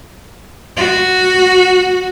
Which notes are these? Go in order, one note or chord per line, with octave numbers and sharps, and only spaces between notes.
F#4